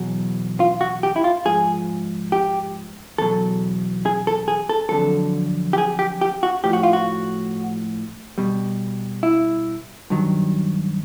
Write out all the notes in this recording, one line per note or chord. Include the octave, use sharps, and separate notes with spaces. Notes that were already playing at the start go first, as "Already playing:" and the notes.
Already playing: E2 B2 F#3
F4
F#4
G4
E4
F4
G#2 F3 G#4
G4
E2 B2 F#3 A4
G#4
A4
G#4
A4
F2 D3 F#3 A4
G4
G#4
G4
G4
F#4
A2 F3 G4
F#4
F4
F#4
B2 G3
E4
G2 D#3 F#3